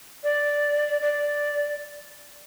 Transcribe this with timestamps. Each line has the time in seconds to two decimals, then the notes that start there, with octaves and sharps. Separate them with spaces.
0.23 D5
1.01 D5